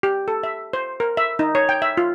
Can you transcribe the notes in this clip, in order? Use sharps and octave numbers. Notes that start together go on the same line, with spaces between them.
G4
A4
E5
C5
A#4
E5
D#4
C#5
G5
E5
F4